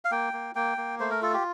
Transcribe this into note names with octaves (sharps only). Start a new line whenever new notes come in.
F5
A#3 G5
A#3
A#3 G5
A#3
A3 C5
A#4
F4 A4
G4